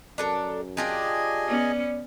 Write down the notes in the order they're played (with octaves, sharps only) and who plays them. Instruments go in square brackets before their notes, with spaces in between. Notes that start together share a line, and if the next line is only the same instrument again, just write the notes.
[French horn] F#2 [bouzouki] D4 A4 A#4
[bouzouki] D4 F4 G4 [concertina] G#4 D#5 G#5
[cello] B3 C#4 [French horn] D5